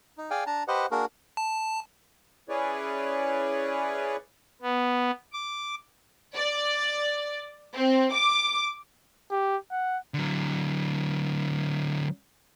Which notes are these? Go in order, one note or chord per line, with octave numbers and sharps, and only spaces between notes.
D#4
G#4 D5 F5 G5 G#5
D4 A5 A#5
G4 B4 C5 D#5 F#5
A#3 D4 F#4 G#4 A#4
A5
C#4 E4 G#4 B4 C#5 D5
B3
D6
D5
C4
D6
G4
F#5
D3 F#3